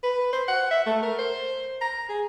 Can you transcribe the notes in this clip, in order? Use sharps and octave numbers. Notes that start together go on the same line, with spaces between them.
B4
C5
F#5
E5
A3
A#4
C5
A#5
G#4